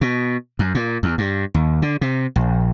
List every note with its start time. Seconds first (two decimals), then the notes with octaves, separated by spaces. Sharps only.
0.01 B2
0.59 F#2
0.75 A#2
1.03 E2
1.18 G2
1.54 D#2
1.82 D3
2.01 C3
2.36 A#1